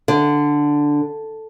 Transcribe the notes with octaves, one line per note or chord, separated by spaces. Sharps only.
D3